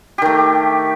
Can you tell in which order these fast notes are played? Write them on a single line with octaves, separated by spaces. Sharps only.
G4 D#3 A3